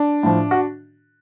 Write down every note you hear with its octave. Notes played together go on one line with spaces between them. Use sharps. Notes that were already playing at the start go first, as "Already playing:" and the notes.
Already playing: D4
A2 F3
F#4